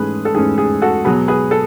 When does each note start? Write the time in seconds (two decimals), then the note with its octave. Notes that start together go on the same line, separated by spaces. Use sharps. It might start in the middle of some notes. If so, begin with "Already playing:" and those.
Already playing: G#2 E3 A3 C#4 G#4 B4
0.25 A4
0.35 G#2 E3 A3 C#4 G#4
0.58 G#4
0.82 F#4 A4
1.05 B2 F#3 B3 G#4 B4
1.28 G#4 B4
1.51 A4